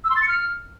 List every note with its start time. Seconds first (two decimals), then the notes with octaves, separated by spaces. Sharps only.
0.04 E6
0.10 C6
0.16 A6
0.22 C#7
0.28 F6